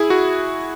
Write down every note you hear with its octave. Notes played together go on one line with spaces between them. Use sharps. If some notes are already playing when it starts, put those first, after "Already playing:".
Already playing: E4 G#4
F#4